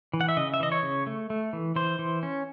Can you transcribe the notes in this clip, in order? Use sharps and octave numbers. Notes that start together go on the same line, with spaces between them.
E3
F#5
E5
C#3 D#5
E5
E3 D#5
C#5
C#3
A3
A3
E3
E3 C5
E3
C#4